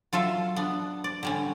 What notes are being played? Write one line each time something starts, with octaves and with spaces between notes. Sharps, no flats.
F#3 F4 A4 E5
B3 D4
D5
D3 G3 C#4